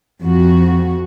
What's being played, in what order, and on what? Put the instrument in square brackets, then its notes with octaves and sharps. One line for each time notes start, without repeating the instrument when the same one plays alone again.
[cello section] F2 F#4